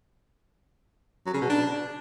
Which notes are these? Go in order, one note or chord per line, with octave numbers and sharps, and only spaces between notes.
F#3
C#3
B2
D4